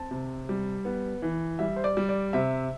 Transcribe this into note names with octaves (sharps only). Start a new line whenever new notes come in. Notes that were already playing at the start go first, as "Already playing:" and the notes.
Already playing: C4 A5
C3
G3
B3
E3
G3 E5
C5
D5
G3
D5
C3 E5